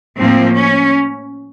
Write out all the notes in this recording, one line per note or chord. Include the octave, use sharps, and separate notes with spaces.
A2 F3 A#3 C4
C#4